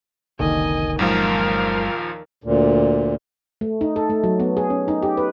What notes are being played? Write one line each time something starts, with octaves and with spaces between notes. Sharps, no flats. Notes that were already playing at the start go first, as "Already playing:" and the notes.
F1 C2 D3 D#3 A#3 D#5 G#5
G1 D#2 A#2 F3 F#3 G#3 A#4 F5
D2 A#2
A3
D#4
A4
A3
F#3
B3
G#4
C#4
D#4
G4
B4